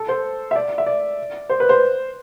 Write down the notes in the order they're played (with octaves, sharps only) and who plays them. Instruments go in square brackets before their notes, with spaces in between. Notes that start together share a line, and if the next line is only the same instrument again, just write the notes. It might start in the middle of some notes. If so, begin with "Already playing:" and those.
Already playing: [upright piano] A4
C5
E5
D5
E5
D5
C5
B4
C5